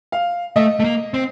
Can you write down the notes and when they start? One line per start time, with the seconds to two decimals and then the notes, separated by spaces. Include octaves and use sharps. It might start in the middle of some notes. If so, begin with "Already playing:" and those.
0.12 F5
0.56 A3 D#5
0.80 A3
0.84 A#3
1.14 C4